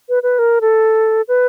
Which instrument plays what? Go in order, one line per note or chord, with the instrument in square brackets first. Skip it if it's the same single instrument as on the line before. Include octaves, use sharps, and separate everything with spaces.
[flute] B4
B4
A#4
A4
B4